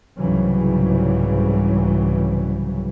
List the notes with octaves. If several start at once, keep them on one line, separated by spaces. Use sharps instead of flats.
C2 G#2 C#3 E3 F#3 G3